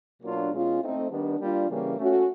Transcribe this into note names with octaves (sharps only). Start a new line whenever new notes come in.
B2 F#3 A#3 D4 F4
B2 G#3 C#4 F4
A3 C4 D#4
D#3 G3 B3 D4
G3 A#3 D4 F4
C#3 E3 G3 A#3 C#4
A3 C#4 F#4